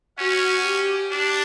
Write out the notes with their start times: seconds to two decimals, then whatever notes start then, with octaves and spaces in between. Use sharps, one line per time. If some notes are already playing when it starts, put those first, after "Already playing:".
0.18 C#4 F#4
0.65 G4
1.11 D4 G4